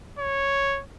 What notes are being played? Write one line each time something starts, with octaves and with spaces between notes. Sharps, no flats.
C#5